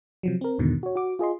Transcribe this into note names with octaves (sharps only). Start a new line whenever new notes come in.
C3 F3 F#3
C4 A#4
E2 G#2 B2 D3 D#3
F#4 C#5
F#4 D6
F4 G#4 D#5 C6